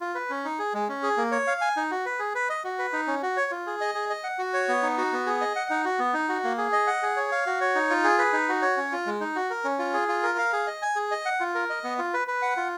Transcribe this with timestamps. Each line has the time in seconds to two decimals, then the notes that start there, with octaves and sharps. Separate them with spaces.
0.01 F4
0.15 B4
0.30 C#4
0.45 D#4
0.59 G#4
0.74 G#3
0.89 C#4
1.03 G#4
1.17 A#3
1.32 C#5
1.47 F5
1.61 G#5
1.77 D#4
1.91 F#4
2.06 B4
2.19 G#4
2.35 B4
2.49 D#5
2.64 F#4
2.79 B4
2.93 D#4
3.07 C#4
3.23 F#4
3.37 C#5
3.51 F4
3.67 G#4
3.81 D#5
3.95 G#4
4.10 D#5
4.24 F#5
4.38 F#4
4.54 C#5
4.68 B3
4.83 D#4
4.98 F#4
5.12 B3
5.26 G#4
5.41 D#5
5.56 F#5
5.70 D#4
5.85 F#4
5.99 B3
6.14 D#4
6.29 F#4
6.44 A#3
6.58 G#4
6.73 D#5
6.87 F#5
7.03 G#4
7.16 C#5
7.32 F5
7.46 F#4
7.61 C#5
7.75 D#4
7.90 F4
8.04 G#4
8.19 B4
8.33 D#4
8.49 F#4
8.62 C#5
8.77 C#4
8.92 F4
9.06 G#3
9.20 D#4
9.35 F#4
9.50 A#4
9.64 C#4
9.79 F4
9.94 G#4
10.08 F4
10.23 A#4
10.38 F5
10.53 G#4
10.67 D#5
10.82 G#5
10.96 G#4
11.11 D#5
11.25 F#5
11.40 F4
11.55 A#4
11.70 D#5
11.84 B3
11.99 F4
12.14 B4
12.28 B4
12.42 F#5
12.57 F4